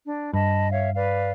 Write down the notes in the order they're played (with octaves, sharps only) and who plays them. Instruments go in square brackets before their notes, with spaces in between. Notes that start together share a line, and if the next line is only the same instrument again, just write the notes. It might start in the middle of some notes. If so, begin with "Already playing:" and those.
[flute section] D4
[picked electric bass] G2 [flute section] D#5 A5 B5
[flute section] C#5 E5 F5
B4 D5 F5